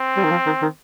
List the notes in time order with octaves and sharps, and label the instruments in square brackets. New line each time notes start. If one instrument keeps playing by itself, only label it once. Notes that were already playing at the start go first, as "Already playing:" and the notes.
Already playing: [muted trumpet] C4
[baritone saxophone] G3
D#3
F3
D#3
D#3